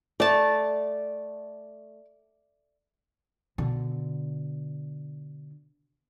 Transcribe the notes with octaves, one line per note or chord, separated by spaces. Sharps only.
A3 D5 A5
B2 D3